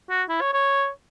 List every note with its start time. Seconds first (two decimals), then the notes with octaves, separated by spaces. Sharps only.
0.09 F#4
0.29 E4
0.41 C#5
0.53 C#5